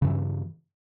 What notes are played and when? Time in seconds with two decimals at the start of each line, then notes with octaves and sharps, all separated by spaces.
0.02 C#3
0.04 G2
0.07 E3